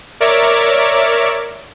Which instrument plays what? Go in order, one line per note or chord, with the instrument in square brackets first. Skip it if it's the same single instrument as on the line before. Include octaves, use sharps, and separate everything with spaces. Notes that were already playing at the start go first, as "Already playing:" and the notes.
[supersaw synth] A#4 C#5 D5 E5 D6